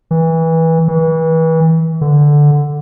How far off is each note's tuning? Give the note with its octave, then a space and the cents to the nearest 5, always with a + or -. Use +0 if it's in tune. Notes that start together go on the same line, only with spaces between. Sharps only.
E3 -20
E3 -30
D3 +0